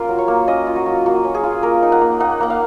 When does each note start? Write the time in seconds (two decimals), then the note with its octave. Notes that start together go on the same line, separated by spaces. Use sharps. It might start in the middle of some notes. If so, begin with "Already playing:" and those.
Already playing: A#3 C#4 F4 A#4
0.09 F#3
0.19 C#5
0.28 A#3
0.48 C#4 D#5
0.67 F4
0.76 F#4
0.86 F#3
1.06 A#3 F#4
1.24 C#4
1.34 G#4
1.44 F4
1.63 A#3 A#4
1.82 D#4
1.92 F#5
2.01 A#3
2.20 D#4 F#5
2.40 A#3 F#5
2.50 F5